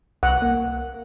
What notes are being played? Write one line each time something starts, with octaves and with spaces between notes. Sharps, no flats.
C2 F#5
A#3